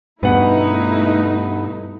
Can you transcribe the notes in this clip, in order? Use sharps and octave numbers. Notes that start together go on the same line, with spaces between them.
G2 B2 A3 D#4 E4 B4 F#5